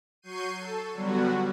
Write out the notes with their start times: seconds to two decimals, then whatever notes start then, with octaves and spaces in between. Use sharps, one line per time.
0.22 F#3 C#6 G6 C7 D#7
0.59 A4
0.94 D3 F#3 G3 B3 F#4